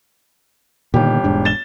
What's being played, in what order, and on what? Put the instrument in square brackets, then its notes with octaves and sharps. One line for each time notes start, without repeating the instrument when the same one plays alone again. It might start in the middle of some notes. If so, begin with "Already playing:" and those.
[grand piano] G1 G4 [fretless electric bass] A#2 D3 D#3
[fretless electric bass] E1 G#2 D4
[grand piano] A6 E7 G7